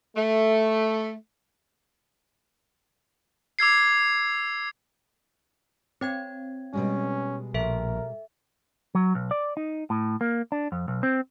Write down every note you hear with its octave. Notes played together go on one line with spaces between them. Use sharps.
A3
D6 E6 G#6 C7
C4 C5 C#5 G5 G#6
B2 G3 G#3 C#4
A#1 A4 A#4 E5
F#3
B1
D5
D#4
A2
A#3
D4
F2
B1
C4